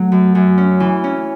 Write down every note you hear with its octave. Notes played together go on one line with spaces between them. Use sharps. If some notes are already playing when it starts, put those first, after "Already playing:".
Already playing: F#3 A3
F#2
F#2
C#4
E3
C#4